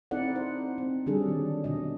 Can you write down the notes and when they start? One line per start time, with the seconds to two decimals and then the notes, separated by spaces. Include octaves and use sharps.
0.11 C4 D#4 E4 A4 D5 F#5
0.35 D#4 C5
0.78 C4
1.06 D3 F#3 G3 D4 G#4 A4
1.28 D#3
1.64 B2 D3 D#5